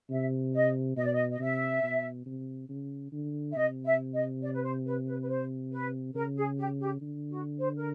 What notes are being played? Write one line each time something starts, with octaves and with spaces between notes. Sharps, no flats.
C3 E5
D#5
B2 D#5
D5
D#5
D#5
C3 E5
B2
C3
C#3
D3
E5
C3 D#5
E5
D#5
D5
B4
C5
B4
B4
B4
C5
B4
C#3 A#4
G#4
G4
G4
D3
F#4
C5
A#4